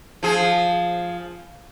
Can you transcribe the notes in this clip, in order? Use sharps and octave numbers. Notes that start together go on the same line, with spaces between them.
F3 G#4